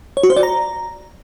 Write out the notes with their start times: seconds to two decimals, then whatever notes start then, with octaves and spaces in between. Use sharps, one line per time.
0.17 C#5
0.23 F#4
0.30 C5
0.37 D5
0.43 A#5